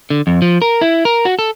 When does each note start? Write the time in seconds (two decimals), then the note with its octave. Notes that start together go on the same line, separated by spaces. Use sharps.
0.10 D3
0.27 F2
0.42 F3
0.62 A#4
0.81 E4
1.05 A#4
1.25 F#4
1.39 A4